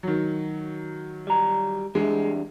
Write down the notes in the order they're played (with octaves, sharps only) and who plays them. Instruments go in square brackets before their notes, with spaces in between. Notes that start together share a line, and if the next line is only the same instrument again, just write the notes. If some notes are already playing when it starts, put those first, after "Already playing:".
[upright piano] D#3 F#3
[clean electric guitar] G3 A#5
[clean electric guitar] E3 G3 D4 [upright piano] G#3